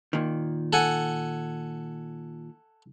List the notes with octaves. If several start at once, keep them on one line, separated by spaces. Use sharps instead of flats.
A#2 D#3
A4 F#5 G#5